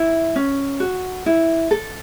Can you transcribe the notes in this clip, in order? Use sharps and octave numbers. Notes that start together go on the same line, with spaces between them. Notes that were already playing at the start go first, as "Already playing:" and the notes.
Already playing: E4
C#4
F#4
E4
A4